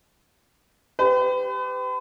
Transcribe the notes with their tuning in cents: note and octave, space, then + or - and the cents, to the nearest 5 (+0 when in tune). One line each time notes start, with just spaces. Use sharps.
G4 +0 B4 +40